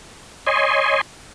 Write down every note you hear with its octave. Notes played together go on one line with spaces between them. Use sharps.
C#5 D#5 G#5 C6